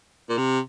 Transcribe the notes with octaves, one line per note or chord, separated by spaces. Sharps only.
A#2
C3